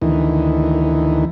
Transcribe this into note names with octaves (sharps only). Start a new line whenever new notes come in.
D2 D#3 E3